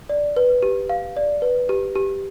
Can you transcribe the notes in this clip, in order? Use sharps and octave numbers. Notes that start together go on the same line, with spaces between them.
D5
B4
G4
F5
D5
B4
G4
G4